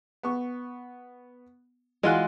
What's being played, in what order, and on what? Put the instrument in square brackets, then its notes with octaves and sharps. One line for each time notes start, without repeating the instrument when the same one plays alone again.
[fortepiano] B3 C#6
[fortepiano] E3 F#4 F#6 [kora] G#3 F4